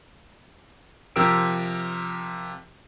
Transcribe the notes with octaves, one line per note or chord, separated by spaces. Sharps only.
C3 F3 G4 A#4 E6 D7